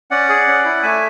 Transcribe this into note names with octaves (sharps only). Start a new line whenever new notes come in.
C#4 D5 F#5
G#4
C#4
E4
A3 E5 G#5